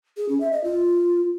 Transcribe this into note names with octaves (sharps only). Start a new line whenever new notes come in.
G#4
C#4
E5
D#5
F4